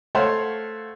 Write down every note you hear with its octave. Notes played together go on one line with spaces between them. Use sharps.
A3 C5 C#5 F5 F#5